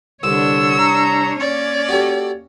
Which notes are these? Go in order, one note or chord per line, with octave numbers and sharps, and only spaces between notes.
C2 D3 D4 C#5 E6
A#5
A#3 C#4 C#5 D5
F#4 G4 A4